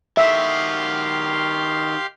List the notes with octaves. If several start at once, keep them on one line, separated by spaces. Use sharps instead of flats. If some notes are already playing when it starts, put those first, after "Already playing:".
D#3 F#4 G4 E5 F5 C6